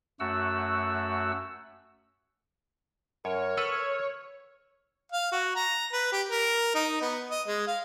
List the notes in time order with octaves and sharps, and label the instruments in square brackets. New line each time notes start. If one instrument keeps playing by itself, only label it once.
[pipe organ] F#2 A3 F#4 F#5 E6
[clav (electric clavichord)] F#2 [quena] A#4 [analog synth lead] C#5
[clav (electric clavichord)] A4 B4 F#5 [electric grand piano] E6 F6
[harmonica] F5
F#4
A#5
B4
G4
A#4
D#4
B3
D#5
G#3
F5